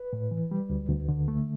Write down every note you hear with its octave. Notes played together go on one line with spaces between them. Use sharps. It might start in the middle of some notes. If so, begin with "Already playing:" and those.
Already playing: B4
A2
E3
G3
D2
D2
D3
A3